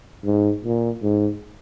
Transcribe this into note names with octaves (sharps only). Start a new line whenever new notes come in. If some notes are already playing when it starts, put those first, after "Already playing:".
G#2
A#2
G#2